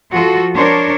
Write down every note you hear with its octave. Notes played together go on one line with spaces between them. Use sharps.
F3 F4 F#4 A4
D4 A#4 C5 C#5